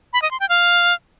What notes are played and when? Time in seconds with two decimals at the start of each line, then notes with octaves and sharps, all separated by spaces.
0.13 B5
0.22 D#5
0.31 C6
0.40 G5
0.49 F5